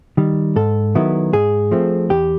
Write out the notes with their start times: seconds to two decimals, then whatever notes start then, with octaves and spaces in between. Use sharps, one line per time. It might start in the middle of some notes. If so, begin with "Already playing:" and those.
0.17 D#3 G3
0.56 G#2 A4
0.95 D#3 F#3 B3 E4
1.33 G#2 G#4
1.71 F3 A3 C4
2.10 E2 G4